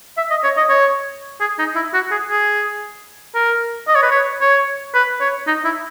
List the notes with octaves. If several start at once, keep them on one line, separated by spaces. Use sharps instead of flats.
E5
D#5
C#5
D#5
C#5
G#4
D#4
E4
F#4
G#4
G#4
A#4
D#5
C#5
B4
C#5
C#5
B4
C#5
D#4
E4